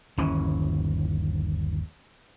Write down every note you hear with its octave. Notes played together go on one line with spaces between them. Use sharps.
G1 D#2 E3 C#4